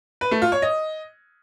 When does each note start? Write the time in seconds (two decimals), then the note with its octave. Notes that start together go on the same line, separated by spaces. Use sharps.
0.21 B4
0.31 A3
0.42 F4
0.52 C#5
0.62 D#5